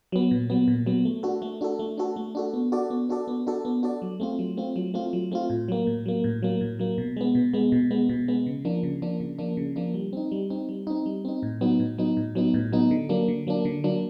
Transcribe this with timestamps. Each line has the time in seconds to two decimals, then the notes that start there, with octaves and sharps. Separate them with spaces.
0.12 F#3 B3
0.31 A#2
0.50 F#3 B3
0.68 A#2
0.86 F#3 B3
1.05 A3
1.23 D4 F#4 A4
1.42 A3
1.61 D4 F#4 A4
1.79 A3
1.98 D4 F#4 A4
2.16 A3
2.35 D4 F#4 A4
2.54 B3
2.72 D4 F#4 A4 D5
2.90 B3
3.09 D4 F#4 A4 D5
3.28 B3
3.47 D4 F#4 A4 D5
3.65 B3
3.83 D4 F#4 A4 D5
4.02 F#3
4.20 A3 C4 F4
4.39 F#3
4.57 A3 C4 F4
4.76 F#3
4.94 A3 C4 F4
5.13 F#3
5.32 A3 C4 F4
5.50 A2
5.68 F#3 A#3
5.87 A2
6.06 F#3 A#3
6.24 A2
6.43 F#3 A#3
6.61 A2
6.79 F#3 A#3
6.98 B2
7.17 G#3 B3
7.35 B2
7.53 G#3 B3
7.72 B2
7.91 G#3 B3
8.09 B2
8.28 G#3 B3
8.47 C#3
8.65 F3 A#3 D4
8.83 C#3
9.02 F3 A#3 D4
9.20 C#3
9.39 F3 A#3 D4
9.57 C#3
9.76 F3 A#3 D4
9.94 G3
10.13 C4 D#4
10.32 G3
10.50 C4 D#4
10.69 G3
10.87 C4 D#4
11.06 G3
11.25 C4 D#4
11.43 A2
11.61 F#3 B3 D#4
11.80 A2
11.98 F#3 B3 D#4
12.17 A2
12.35 F#3 B3 D#4
12.54 A2
12.72 F#3 B3 D#4
12.91 D3
13.09 F#3 A#3 D4
13.28 D3
13.47 F#3 A#3 D4
13.65 D3
13.84 F#3 A#3 D4